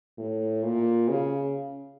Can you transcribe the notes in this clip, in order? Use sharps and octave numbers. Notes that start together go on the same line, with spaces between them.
A2
A#2
C#3